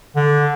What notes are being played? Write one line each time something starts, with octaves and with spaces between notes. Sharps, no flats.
D3